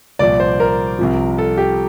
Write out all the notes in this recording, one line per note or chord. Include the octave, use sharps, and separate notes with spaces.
C2 A#2 F3 D5
C5
A#4
C2 C3 F3
A4
G4